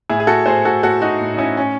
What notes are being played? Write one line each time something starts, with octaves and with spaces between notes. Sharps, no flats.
A2 E4 G#4
G#4
F#4 A4
A2 G#4 C5
F#4 A4
A2 F#4 A4
D#4 F#4
A2
D#4
C#4 E4
C#4